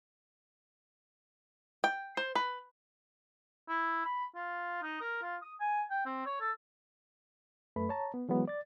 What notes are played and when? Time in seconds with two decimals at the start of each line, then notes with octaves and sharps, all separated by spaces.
1.84 G5
2.17 C5
2.35 B4
3.69 E4
4.05 B5
4.35 F4
4.82 D#4
5.01 A#4
5.22 F4
5.42 D#6
5.60 G#5
5.91 G5
6.05 C4
6.26 C#5
6.40 A4
7.76 F#2 A3 B4 B5
7.89 C#5 A5 A#5
8.14 B3
8.29 E3 F#3 G#3 B3
8.48 D5 A6